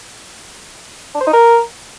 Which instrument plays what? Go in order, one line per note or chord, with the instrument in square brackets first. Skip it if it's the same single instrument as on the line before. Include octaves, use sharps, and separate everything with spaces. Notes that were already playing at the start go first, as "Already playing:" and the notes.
[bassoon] D4
C5
D#4
A#4